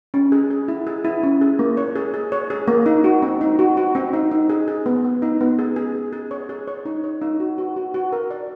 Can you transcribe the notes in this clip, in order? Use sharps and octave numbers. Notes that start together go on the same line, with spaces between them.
C#4
G#4
G#4
E4
G#4
E4
C#4
G#4
A#3
C#5
G#4
G#4
C#5
G#4
A#3
D#4
F#4
C4
D#4
F#4
F#4
C4
D#4
D#4
G#4
G#4
B3
B3
D#4
B3
G#4
G#4
G#4
G#4
C#5
G#4
C#5
D#4
C#5
D#4
F#4
F#4
F#4
F#4
A#4
D5